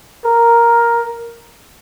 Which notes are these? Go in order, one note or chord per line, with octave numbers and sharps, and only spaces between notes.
A#4